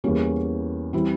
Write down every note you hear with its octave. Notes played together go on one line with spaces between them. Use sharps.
E2 E3 G3 A#3 C#4
E3 G3 C4 E4